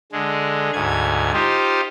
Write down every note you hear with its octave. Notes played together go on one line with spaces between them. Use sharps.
D3 G#3
D2 G#2 G#6
D#4 F4 G4 C5